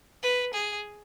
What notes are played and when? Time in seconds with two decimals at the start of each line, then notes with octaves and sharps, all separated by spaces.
0.23 B4
0.53 G#4